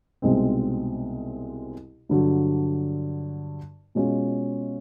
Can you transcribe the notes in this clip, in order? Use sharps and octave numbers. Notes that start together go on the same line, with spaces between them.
C2 B2 G#3 C4 D#4
G2 D3 F#3
B2 G#3 C#4 F4